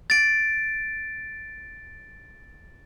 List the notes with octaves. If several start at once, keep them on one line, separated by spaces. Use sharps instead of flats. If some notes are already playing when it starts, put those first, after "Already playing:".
A6 D7